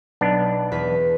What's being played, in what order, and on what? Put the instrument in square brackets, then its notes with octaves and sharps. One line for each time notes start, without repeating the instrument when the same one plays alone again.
[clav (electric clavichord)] B1 B3 D4
[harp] E2 B4 B6